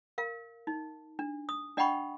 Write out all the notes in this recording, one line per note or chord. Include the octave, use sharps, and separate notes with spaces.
A#4 F5
D#4
D4
D#6
D4 D#5 F#5 G5 B5 C#6